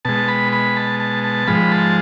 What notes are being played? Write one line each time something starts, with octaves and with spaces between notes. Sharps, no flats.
B2 G#3 A5
B5
B5
A5
A5
A5
G#2 F3 G#3 B5
A5